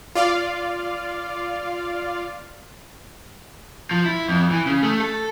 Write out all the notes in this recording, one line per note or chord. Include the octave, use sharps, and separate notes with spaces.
F4 D5 F5
F3
E4
F2
E3
C#3
A3
A4